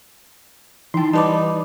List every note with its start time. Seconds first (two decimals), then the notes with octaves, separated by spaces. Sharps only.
0.94 E3 D#4 G5 A5 C6
1.13 G3 D#4 B4 D5 A5 B5 D6